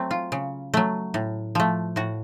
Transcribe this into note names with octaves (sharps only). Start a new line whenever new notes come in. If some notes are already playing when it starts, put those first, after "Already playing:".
Already playing: F#3 A3 C4
F4
C#3
F#3 A3
A2
F3 A3
A2 F#4